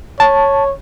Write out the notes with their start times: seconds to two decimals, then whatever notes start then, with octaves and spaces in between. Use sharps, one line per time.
0.20 C#5 A5